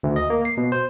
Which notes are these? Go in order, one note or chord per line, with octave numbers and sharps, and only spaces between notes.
D2
D#5
A#3
C7
B2
C5